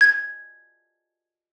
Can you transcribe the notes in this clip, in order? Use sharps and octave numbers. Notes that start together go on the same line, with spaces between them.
G#6